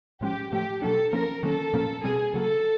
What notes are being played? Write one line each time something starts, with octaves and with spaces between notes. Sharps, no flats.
A2 F3 G#3 C#4 G4
A2 F3 A3 G4
B2 F#3 A#3 D4 A4
F3 A#3 C#4 A#4
D#3 F#3 A#3 C#4 A4
A#2 F3 A#3 C#4
B2 G3 C4 G#4
C#3 F#3 A#3 A4